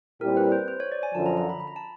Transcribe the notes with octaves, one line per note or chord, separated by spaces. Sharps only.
A#2 G3 C4 E4 G4 A#4
B4
C5
C5
C#5
D5
G#5
F#2 D3 F3 A5
A#5
A#5
B5
B5
A#5
A5